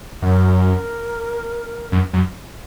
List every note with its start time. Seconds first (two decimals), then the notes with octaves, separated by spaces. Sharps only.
0.22 F#2 A#4
1.92 F#2
2.13 F#2